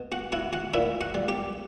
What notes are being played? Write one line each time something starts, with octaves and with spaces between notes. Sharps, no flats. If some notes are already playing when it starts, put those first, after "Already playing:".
Already playing: B2
F#4 F#5
E4 F#4 F#5
F#4 F#5
A#2 E4 E5
F#4 F#5
G3
G4 G5